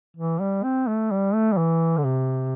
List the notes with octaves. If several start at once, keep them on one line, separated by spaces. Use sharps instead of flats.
E3
G3
C4
A3
G3
A3
G3
E3
D3
C3